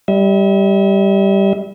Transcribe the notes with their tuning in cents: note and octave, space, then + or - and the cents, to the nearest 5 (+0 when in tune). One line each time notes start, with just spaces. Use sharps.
G3 +0 E5 -40